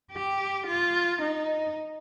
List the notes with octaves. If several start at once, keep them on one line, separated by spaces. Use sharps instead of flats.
G4
F4
D#4